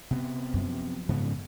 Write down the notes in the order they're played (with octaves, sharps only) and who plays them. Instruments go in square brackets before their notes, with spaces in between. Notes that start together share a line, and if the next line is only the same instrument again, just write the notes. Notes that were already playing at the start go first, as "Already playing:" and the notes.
[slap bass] C3 B3
[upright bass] F#2 F3
[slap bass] G#2 C#3 B3